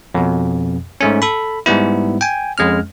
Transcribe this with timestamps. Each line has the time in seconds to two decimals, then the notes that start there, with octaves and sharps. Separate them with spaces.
0.14 F2 B2
1.01 G#2 A3 C#4
1.22 A4 B5
1.66 G#2 G3 B3 E4
2.21 G5 G#5
2.58 F2 G#3 C#4 F6